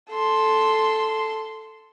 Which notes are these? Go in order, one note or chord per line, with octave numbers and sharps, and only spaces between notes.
A4 C6